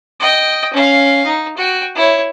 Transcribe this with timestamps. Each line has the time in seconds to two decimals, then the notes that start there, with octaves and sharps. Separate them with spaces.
0.20 D#5 G5
0.73 C#4 F5
1.25 D#4
1.57 F#4 G5
1.95 E4 C#5